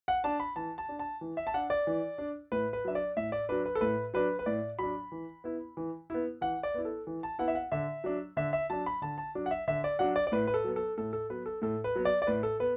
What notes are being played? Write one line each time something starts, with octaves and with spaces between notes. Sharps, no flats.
F#5
D4 A5
B5
E3 A5
A5
D4
A5
E3
E5
A5
D4 F#5
D5
E3
D4
A2 B4
B4
F#3 D4 E5
D5
A2 E5
D5
F#3 D4 B4
B4
A4
A2 B4
F#3 D4 B4
B4
A2 D5
F#3 D4 B5
E3
B3 E4
E3
B3 E4
E3 F#5
D5
B3 E4
A4
E3
A5
B3 E4 F#5
E5
F#5
D3 E5
F#3 D4
D3 E5
E5
F#3 D4 A5
B5
D3 A5
A5
F#3 D4
F#5
E5
D3 E5
D5
F#3 D4 F#5
D5
D5
A2 B4
B4
A4
F#3 B3
A4
A2 A4
A4
F#3 B3 B4
A4
A2 A4
B4
F#3 B3
D5
D5
A2 B4
A4
B3 B4